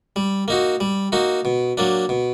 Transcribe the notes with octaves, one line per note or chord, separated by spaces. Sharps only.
G3
A#3 D#4 F#4
G3
A#3 D#4 F#4
B2
F#3 A#3 D4
B2